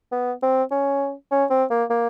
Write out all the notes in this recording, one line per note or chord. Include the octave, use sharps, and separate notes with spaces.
B3
C4
C#4
C#4
C4
A#3
A#3